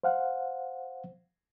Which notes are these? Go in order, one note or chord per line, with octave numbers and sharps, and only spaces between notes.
C5 F5 F#5